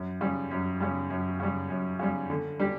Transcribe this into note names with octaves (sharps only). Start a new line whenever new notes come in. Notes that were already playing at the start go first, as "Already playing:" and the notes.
Already playing: F#2
C#3 G3
F#2
C#3 G3
F#2
C#3 G3
F#2
C#3 G3
D3
G3 D4 G4